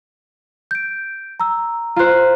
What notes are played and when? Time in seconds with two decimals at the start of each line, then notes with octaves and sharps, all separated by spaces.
0.71 G6 D7
1.40 A#5 E6
1.96 F4 C5 A#5 F#6